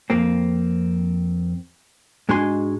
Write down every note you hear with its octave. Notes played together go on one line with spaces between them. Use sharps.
F2 A#3 C4
G#2 G#3 D4 F#4 G#5 C6